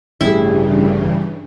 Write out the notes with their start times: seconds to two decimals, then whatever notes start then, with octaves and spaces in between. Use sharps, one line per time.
0.21 A1 G2 C#3 E3 G3 E4 G#4